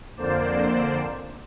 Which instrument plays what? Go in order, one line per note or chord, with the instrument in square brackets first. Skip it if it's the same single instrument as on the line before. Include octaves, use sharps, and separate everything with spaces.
[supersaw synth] F2 D3 A#3 C5 D5 E7